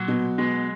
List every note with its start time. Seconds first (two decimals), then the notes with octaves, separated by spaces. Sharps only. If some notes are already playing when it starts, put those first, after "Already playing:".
Already playing: A#2 F#3
0.08 B2
0.38 B2 G#3